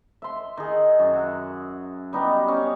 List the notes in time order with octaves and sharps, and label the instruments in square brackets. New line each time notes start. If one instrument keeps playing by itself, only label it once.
[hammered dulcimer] E5 C6
D#3 G#4
F#2
E5 F#5
G3 B3 D#4 G4
C#4